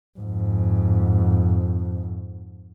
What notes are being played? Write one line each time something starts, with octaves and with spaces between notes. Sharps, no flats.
F2 G#2